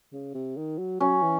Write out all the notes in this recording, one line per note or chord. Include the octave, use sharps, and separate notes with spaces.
C#3
C3
D#3
F#3
F#3 C#4
E3